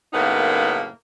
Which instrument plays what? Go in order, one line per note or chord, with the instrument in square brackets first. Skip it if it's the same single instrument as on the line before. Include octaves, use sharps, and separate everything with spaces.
[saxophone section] F#2 A2 C#3 A#3 B3 D#4